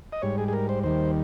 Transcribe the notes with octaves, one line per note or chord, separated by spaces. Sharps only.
D#5
G#2 G3 C#5
G#4
G#4
A#4
C5
D#2 D#3 G3 C5